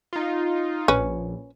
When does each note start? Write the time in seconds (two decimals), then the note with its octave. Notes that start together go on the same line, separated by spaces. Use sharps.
0.13 D#4 F4
0.88 A#1 C#4 B4